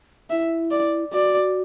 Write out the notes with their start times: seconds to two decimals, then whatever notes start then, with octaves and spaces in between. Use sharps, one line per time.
0.30 E4 E5
0.71 D5
1.13 F#4 D5